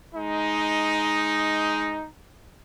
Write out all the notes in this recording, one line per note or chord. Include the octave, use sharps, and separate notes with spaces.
G#3 D#4